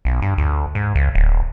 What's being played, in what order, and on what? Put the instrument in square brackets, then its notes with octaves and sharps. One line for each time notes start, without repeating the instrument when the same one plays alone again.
[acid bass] B1
G2
D2
G#2
C#2
D1